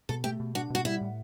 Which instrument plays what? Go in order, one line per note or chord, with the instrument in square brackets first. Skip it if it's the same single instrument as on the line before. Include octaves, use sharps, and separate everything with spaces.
[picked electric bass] B2 [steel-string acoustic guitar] A4
[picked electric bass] A3 [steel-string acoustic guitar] G4
[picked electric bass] B2
[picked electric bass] D4 [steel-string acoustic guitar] F#4
[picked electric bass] B2 [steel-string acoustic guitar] F#4
[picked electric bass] G3 [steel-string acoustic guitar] E4
[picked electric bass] A2